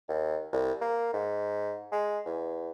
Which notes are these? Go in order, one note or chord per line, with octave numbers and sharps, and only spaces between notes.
D#2
C2
A#3
G#2
G#3
E2